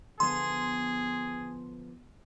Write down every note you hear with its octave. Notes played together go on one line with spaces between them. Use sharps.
D3 F3 B3 G#4 C6